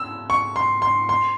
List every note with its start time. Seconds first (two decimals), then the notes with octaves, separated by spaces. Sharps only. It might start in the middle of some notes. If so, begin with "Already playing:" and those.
Already playing: E6
0.30 C#6
0.56 C6
0.82 C6
1.09 C6